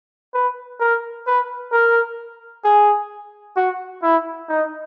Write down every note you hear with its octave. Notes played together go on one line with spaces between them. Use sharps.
B4
A#4
B4
A#4
G#4
F#4
E4
D#4